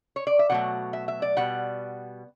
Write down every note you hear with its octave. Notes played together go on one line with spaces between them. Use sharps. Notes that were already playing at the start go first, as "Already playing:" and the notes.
C#5
D5
E5
B2 F#3 A3 F#5
E5
E5
D5
B2 G3 F#5